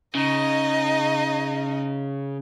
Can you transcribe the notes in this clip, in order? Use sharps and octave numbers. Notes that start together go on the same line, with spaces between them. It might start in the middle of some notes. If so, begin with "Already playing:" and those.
C#3 D#4 D#5